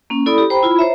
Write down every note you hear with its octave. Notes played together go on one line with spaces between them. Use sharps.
A#3 C#4
E4 A4 D5 B5 D#6
G4
C5 G5 A#5 B5
E4 F4 B5
C5 C#5 E5 A#5